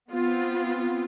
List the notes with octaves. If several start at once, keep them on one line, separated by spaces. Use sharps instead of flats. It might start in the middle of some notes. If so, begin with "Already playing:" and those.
B3 C4 F4